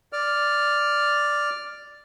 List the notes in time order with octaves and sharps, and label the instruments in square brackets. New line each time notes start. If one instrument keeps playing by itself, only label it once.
[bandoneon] D5 F6